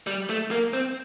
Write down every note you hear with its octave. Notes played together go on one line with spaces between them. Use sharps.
G3
A3
A#3
C4